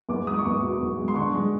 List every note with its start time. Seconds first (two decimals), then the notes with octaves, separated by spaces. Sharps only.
0.09 E2 D6
0.27 G#3 D#6
0.39 C#6
0.44 E2 D6
0.62 B2
0.81 E2
0.98 G#3
1.08 C6
1.16 D3 C#6
1.34 G#3